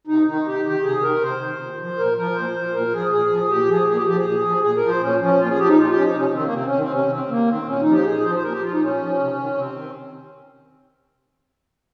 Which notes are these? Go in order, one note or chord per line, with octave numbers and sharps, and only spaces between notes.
C3 D#4
D#3 D#4
C3 G4
D#3 G4
C3 G#4
D#3 A#4
C3 C5
D#3
A#2
F3
A#2 A#4
F3 A#4
A#2 C5
F3
A#2 A#4
F3 G#4
A#2 G#4
F3
A#2 G4
F3 G#4
A#2 G#4
G4
F3 G4
G#4
A#2
F3
A#2 G#4
A#4
F3
C5
A#2 C#4
F3 C#4
A#2 F4
G#4
F3 G4
D#4
A#2 F4
G4
F3 C#4
D#4
C3 C#4
D#3 C4
A#3
C3 C4
C#4
D#3
C4
C3 C#4
D#3 C4
C3 A#3
D#3 C4
A#2 C#4
D#4
F3
G4
A#2 G#4
F3 C5
C5
A#2 A#4
G4
F3 F4
D#4
A#2 C#4
F3
C3
D#3
C3 C4
D#3